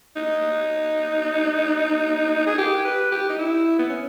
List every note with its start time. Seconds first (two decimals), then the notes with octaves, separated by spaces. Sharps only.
0.16 D#4
2.47 G#4
2.58 G4
2.85 B4
3.12 G4
3.30 D#4
3.39 E4
3.79 B3
3.89 C#4